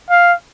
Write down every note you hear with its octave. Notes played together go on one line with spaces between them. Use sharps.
F5